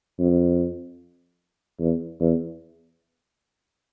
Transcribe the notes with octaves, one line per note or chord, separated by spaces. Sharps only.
F2
E2
E2